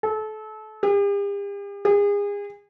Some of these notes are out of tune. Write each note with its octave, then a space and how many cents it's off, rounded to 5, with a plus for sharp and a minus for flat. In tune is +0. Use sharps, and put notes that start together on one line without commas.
A4 -30
G4 +45
G#4 -35